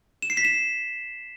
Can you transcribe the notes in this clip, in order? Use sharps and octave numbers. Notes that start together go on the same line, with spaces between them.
E7
C7
B6
E7